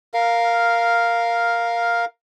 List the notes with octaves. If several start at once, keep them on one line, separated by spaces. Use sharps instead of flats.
A#4 F5